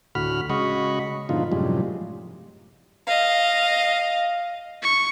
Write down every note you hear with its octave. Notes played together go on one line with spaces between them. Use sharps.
D2 A2 F#4 B5 F6
C#3 G#3 F#4 D#5 B5 C#6
G#2 B2 D3 F3 D#4 F4
F#2 A2 C3 F3 G3 G#3
D#5 F5
C#6